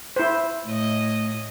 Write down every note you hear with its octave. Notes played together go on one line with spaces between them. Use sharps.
E4 C5
A2 D#5